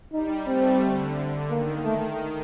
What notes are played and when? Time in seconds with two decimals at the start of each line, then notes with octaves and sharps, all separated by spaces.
0.13 G3 D#4
0.47 A3 C4
0.81 D3
1.50 D#3 A#3
1.85 D#3 A3